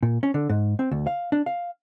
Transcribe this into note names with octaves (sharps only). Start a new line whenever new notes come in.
A#2
C#4
D3
G#2
C4
D2
F5
D4
F5